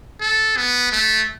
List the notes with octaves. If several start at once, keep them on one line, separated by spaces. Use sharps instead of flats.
A4
B3
A3